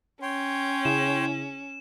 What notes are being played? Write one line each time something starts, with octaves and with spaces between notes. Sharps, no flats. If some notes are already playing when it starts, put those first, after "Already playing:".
C#4 C#5 G5 C6
C#3 E4 G#4 E7